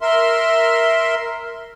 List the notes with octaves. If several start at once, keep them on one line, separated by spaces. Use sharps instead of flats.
A#4 E5 C6